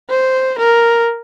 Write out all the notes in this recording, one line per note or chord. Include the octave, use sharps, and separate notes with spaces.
C5
A#4